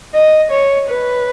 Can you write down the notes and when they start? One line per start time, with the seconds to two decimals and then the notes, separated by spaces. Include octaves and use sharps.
0.14 D#5
0.52 C#5
0.89 B4